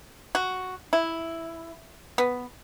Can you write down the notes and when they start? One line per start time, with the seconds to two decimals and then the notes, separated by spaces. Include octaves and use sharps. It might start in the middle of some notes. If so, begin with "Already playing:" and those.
0.35 F#4
0.93 E4
2.18 B3